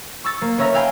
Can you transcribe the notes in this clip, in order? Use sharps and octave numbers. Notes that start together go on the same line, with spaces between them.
C#6 E6 A6
A#3
B3 C#4 C#5 E5 A#5
E5 F5 G5 G#5 B5